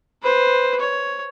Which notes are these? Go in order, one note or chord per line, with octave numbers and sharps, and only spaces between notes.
B4 C5
C#5